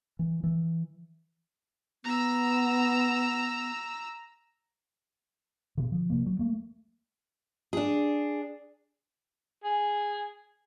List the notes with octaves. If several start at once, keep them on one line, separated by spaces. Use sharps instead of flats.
E3
E3
B3 A#5 E6
B2 D3
F3
C3 A#3
F#3
A3 A#3
D4 G#4
G#4